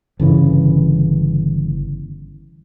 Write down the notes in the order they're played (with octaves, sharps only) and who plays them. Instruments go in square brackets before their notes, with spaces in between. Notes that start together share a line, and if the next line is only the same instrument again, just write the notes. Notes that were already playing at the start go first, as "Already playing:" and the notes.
[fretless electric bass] G1 C#3 E3